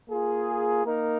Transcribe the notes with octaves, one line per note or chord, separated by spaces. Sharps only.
A#3 F4 G#4
A#3 D#4 A#4